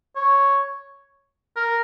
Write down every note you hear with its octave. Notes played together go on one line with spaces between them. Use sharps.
C#5
A#4